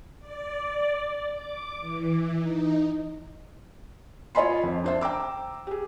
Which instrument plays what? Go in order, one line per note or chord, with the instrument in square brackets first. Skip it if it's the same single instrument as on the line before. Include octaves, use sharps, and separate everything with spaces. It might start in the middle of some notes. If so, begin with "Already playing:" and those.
[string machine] D5
D6
E3
D#4
[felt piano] F4 C#5 D#5 G#5 B5 C6
F2
D4 C5 E5
G5 A#5 D6 E6
G4 G#4